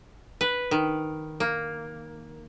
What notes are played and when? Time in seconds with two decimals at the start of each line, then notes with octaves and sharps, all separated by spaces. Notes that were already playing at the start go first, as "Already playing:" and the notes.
0.41 B4
0.71 D#3
1.40 A#3